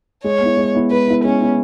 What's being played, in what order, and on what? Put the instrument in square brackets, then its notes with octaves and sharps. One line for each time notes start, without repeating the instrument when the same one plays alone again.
[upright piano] G#3 [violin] C#5
[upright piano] B3 E4
G#3
B3 E4
[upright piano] G#3 [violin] B4
[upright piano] B3 E4
[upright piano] G#3 [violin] C#4
[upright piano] B3 E4